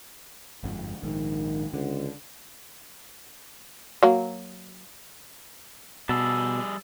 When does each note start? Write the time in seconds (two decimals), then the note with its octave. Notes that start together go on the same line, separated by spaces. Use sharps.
0.63 G1 F2 G#2
1.03 A#1 G#2 D#3
1.73 C#2 D3
4.03 F#3 A#3
6.09 B2 G3 G#4 A5 E6